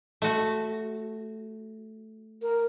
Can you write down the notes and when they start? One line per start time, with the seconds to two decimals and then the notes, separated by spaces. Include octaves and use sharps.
0.22 A3 F#4
2.42 A#4